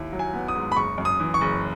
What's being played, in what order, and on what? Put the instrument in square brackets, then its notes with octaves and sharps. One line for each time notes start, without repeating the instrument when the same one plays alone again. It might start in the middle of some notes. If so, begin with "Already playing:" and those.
Already playing: [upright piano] D#2 E4
F#3
[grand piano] G#5
[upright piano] B3
[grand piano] D#6
[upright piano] G#2
[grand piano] B5
[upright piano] F#1 [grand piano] C#6
[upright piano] F#2
[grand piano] D#6
[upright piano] E3
[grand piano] C#6
[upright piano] F#1